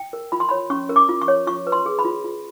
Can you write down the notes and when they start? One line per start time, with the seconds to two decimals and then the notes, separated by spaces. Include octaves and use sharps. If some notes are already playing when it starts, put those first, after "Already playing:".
Already playing: G5
0.13 A#4
0.32 F4 B5
0.40 C6
0.49 C#5 B5
0.70 C#4 C#6
0.89 A#4
0.96 D6
1.09 F4
1.22 C#6
1.28 C#5
1.47 F4 C#6
1.67 B4
1.72 C6
1.86 G#4
1.99 B5
2.05 F4
2.24 F4